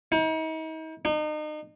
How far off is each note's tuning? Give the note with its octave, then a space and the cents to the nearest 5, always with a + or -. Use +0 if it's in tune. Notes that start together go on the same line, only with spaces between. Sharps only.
D#4 +40
D#4 -35